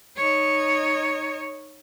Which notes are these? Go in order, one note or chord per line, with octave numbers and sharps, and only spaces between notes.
D#4 C#5